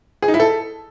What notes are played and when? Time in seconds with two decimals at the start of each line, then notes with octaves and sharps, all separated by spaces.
0.22 G#4
0.28 D#4
0.34 E4
0.40 A4